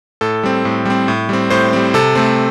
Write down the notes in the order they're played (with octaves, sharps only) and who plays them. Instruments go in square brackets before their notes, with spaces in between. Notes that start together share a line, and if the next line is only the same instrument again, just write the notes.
[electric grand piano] A2 A4
G3 C4
A2
G3 C4
A2
G3 C4
A2 C5
G3 C4
C3 A4
A3 C4